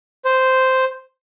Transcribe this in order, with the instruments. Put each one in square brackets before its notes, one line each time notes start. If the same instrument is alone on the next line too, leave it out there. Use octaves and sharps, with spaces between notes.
[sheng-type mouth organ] C5